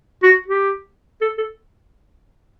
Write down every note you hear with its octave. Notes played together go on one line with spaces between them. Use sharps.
F#4
G4
A4
A4